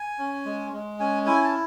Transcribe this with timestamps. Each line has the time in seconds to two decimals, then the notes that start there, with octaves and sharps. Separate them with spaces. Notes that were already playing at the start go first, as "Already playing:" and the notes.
Already playing: G#5
0.19 C#4
0.45 G#3
0.73 G#3
1.00 C#4 G#5
1.26 E4 G#5
1.44 A5